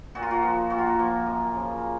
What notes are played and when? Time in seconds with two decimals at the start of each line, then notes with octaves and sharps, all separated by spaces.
0.15 A#2 F#4
0.23 F4
0.31 F#4
0.43 F3
0.70 A#2 F#4
0.79 F4
0.87 F#4
0.99 F3 A#3
1.26 F#2
1.55 C#3 F3